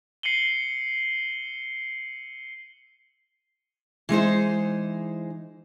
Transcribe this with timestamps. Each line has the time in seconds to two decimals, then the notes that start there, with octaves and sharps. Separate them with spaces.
0.23 C7 C#7 D#7 F#7 G7
4.09 E3 G#3 D#4 C5